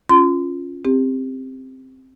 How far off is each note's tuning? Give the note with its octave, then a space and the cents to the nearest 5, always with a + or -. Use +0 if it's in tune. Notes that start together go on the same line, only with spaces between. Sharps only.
C#4 +0 F4 +0 C6 -30
C4 +0 G4 +25